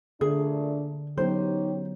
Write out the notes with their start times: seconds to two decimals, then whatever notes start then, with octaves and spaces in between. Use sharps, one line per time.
0.21 A#2 D3 A3 D4 G#4
1.18 F#3 B3 C#4 D#4 G4 C5